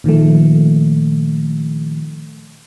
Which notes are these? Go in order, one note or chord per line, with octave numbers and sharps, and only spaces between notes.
A#2 D#3 F3 A3